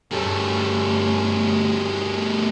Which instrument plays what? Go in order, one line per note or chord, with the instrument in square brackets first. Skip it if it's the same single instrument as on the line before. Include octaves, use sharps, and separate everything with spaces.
[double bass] G2 C#4 [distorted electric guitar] G3 A3